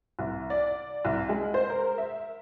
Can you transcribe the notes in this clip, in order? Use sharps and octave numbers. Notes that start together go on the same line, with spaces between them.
C2
D5
C2
G#3
C5
A#4
E5